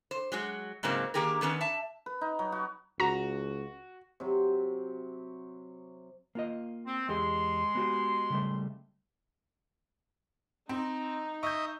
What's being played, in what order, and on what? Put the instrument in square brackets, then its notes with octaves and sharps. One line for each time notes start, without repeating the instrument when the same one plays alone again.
[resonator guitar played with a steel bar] C5
F#3 G#3 F#4
G#2 C#3 F#3 A#3 C4
D3 D#3 A#3 G4 G#4 A#4
D3 D#3 B3 C#4
E5 A5
[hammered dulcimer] B4
D#4
F#3
F#4
[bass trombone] C#2 [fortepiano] F#4 [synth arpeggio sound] A#5
[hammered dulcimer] C3 F#3
[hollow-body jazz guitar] A#3 F4 D#5
[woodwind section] C4
[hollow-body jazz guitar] E2 G4 G#4 [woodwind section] G#3 C6
[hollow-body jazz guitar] B3 F#4 G4
C#3 G3 A3
[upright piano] C4 [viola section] D#4
[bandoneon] D#5 E5 D#6 [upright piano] C#6 G6